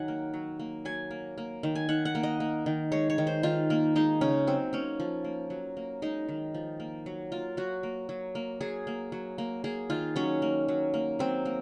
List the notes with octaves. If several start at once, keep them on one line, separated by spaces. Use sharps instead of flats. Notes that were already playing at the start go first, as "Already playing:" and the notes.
Already playing: D#3 F#3 F#5 G#5
A#3
F#3
A#3
F#3 G#5
A#3
A#3
D#3
G#5
D#3 F#5
F#5
A#3
D#5
A#3
D#3
G#3 C#5
C#5
D#3
C5
D#3 F4
A#3
G#3 D#4
C#3 C#4
F#3 C4
A#3 C#4
F3
A#3
F#3
A#3
G#3 D#4
D#3
F3
A#3
F#3
A#3 F4
F#3 F#4
A#3
F#3
A#3
F#3 G#4
A#3
F#3
A#3
A#3 G#4
D#3 F4
F#3 C#4
A#3
F#3
A#3
F#3 C4
A#3